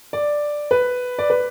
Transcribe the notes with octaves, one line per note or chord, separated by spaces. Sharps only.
D5
B4
D5
B4